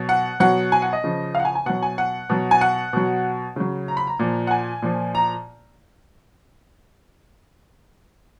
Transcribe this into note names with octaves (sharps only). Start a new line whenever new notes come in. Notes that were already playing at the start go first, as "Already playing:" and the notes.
Already playing: B2 F#3
F#5
B2 F#3 F#5
G#5
F#5
D#5
C#3 F3
F5 F#5
G#5
G#5
B2 F#3 F#5
G#5
F#5
B2 F#3
G#5
F#5
B2 F#3
C#3 F#3
A#5
B5
A#5
A#2 F3
F#5
G#5
A#2 F3
A#5